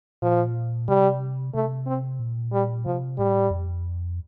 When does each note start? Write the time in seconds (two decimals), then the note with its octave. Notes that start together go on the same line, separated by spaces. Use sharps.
0.22 A#2 F3
0.88 C3 G3
1.54 C3 A3
1.87 C4
2.19 A#2
2.53 G3
2.85 C3 F3
3.18 A2 G3
3.51 F2